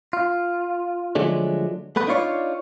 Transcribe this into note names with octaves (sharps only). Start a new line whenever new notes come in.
F4
D3 F3 F#3 G#3 A3 D4
A3 B3 B4
D4 D#4 F4 C#5 D5